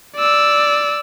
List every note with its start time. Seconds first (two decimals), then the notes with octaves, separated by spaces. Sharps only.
0.16 D5 E6